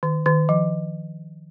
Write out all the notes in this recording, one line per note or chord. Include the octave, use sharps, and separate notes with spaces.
D#3
D#3
F3